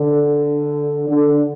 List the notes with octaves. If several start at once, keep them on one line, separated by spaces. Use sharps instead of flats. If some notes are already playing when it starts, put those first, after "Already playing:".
Already playing: D3
D3